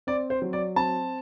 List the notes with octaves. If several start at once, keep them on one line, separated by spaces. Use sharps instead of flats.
C4 D5
C5
F#3
D5
C4 A5